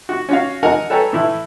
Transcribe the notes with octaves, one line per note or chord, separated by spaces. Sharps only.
F#4
C#4 F#4 F5
A#4 D#5 F#5 G#5 A#5
A4 B4 C#5 G5 G#5 A#5
A2 E3 E4